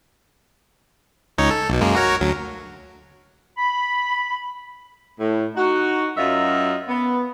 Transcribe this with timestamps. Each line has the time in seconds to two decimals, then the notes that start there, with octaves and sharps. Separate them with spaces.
1.38 C#2 D#4 C#5
1.51 A4
1.69 B1 B2
1.81 F#2 G#3 A#3
1.95 F#4 A#4 C#5
2.21 D2 F#3
3.57 B5
5.19 A2
5.55 D#4 F#4
6.16 F#2 F#3 F4 D#5 E5
6.88 B3